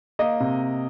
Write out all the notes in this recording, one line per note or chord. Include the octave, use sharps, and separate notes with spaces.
A#3 D#5
C3